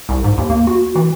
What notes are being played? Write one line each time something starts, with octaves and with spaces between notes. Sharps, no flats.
C2
G#2
D#2
A#3
F#4
E3